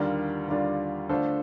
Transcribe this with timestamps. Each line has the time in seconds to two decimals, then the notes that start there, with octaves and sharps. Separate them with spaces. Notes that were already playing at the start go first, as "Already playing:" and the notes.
Already playing: D#2 D3 G3 D4 F4 A#4 D5
0.48 D#2 D3 G3 D4 F4
1.09 D3 A3 D4 F4 A4 C5